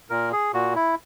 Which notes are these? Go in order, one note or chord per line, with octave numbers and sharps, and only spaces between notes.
A#2 A#4
G#4
A#2 F#4
E4